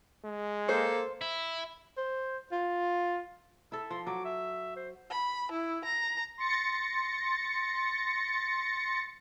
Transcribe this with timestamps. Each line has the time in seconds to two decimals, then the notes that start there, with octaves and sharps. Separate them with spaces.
0.25 G#3
0.69 A#3 A4 C5
1.21 E4
1.97 C5
2.52 F4
3.72 E4 A4 E6
3.90 F3 C6
4.07 F#3 D6
4.25 E5
4.76 C5
5.11 B5
5.52 E4
5.85 A#5
6.38 C6 A6 A#6 C#7